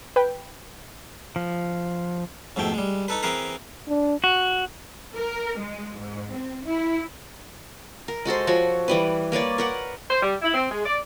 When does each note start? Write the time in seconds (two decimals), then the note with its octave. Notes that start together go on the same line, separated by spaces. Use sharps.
0.16 B4 G5
1.36 F3
2.56 F2 G#2 B2 A3 G5
2.74 G3 G#3
3.08 D#4 A4 B4
3.23 E3 C4 G#4 A#4 B4
3.88 D4
4.24 F#4
5.16 A#4
5.59 G#3
5.98 G#2
6.32 C4
6.64 E4
8.08 A#4
8.25 G#3 F#4 A4 C5
8.47 F3 F#4 C#5
8.88 E3 G3 B4
9.32 A#3 B4 C#5 D5
9.58 A#4 B4 F#5
10.10 C5
10.22 G3
10.42 E4
10.54 C4
10.70 G#3
10.86 D5